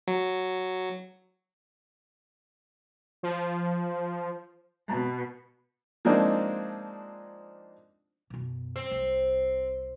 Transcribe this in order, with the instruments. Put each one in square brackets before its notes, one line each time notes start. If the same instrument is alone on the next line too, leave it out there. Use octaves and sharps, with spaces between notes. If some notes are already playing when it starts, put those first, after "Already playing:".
[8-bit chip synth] F#3
[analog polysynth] F3
[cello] B2
[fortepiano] F3 G#3 A#3 C4 D4 D#4
[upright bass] F#2 B2
[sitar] C4
[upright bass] C2